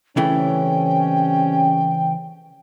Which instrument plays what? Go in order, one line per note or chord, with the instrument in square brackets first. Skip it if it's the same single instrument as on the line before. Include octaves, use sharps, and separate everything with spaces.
[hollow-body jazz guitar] C#3 E3 A3 [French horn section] G3 C4 C#4 [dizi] G5